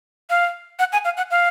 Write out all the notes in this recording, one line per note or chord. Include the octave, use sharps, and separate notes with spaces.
F5
F#5
G#5
F5
F#5
F5